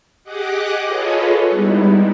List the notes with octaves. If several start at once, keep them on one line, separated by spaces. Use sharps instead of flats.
G4 G#4 D#5 F#5 D6 F#6
F4 G#4 A4 B4 C#5 D#5
G3 G#3 B3 D#4 E4